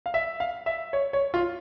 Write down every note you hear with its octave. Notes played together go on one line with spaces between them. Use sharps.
F5
E5
F5
E5
C#5
C#5
F4